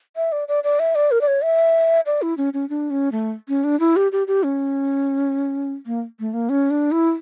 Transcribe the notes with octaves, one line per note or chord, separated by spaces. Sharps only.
E5
D5
D5
D5
E5
D5
A#4
D5
C#5
E5
D5
E4
C#4
C#4
D4
C#4
A3
C#4
D4
E4
G4
G4
G4
C#4
A#3
A3
A#3
C#4
D4
E4